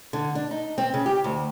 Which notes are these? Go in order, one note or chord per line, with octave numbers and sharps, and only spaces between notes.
D3
D4
D#4
C4
C#3
G4
D2